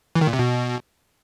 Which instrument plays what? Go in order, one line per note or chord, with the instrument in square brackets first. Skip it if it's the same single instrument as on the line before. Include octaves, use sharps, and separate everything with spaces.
[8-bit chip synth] E3
D#3
A#2
C3
B2